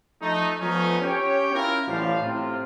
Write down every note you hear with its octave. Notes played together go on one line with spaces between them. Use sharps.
F3 A3 D#4
F3 A3 B3 C#4 D#4
C#4 G4 C#5 G5
C#4 E4 F4 A#4
A1 F#2 F3 G3 F5
A2 C3 C4 F4